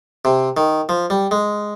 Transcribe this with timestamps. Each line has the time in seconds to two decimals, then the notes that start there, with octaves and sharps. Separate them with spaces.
0.25 C3
0.57 D#3
0.89 F3
1.10 G3
1.31 G#3